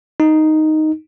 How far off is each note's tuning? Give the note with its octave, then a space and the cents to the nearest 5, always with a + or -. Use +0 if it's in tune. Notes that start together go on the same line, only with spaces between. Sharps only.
D#4 +0